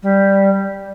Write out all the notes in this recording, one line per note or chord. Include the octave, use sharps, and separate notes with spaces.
G3